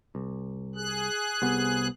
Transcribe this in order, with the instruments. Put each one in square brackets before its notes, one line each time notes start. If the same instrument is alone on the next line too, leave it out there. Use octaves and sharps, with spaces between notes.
[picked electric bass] C2
[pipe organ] G#4 F#6
[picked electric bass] C2 C3 B3